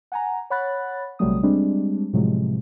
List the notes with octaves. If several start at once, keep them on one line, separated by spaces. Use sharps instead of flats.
F#5 G#5 A#5
C#5 F#5 B5 F#6 A6
A#1 C3 F#3 G3 A3 D#6
G3 G#3 C4 D4
A2 C3 F3 F#3 G#3